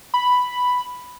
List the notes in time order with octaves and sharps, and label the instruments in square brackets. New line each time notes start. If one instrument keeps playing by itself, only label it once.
[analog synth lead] B5